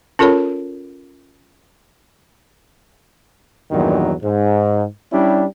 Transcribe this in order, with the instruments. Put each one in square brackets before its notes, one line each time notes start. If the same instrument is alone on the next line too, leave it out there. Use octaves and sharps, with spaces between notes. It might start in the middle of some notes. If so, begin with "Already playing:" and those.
[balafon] C#4 F4 A4 A#4 C#5 B5
[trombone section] E2 G2 A#2 D#3 F#3
G#2
G3 C#4 D4 E4 G4